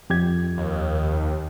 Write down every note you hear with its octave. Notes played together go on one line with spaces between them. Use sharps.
F2 G4 G#6
D#2